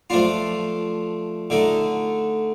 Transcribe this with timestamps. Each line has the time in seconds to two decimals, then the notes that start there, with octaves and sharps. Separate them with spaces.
0.10 F3 A3 D4 F4
1.50 D3 A3 D#4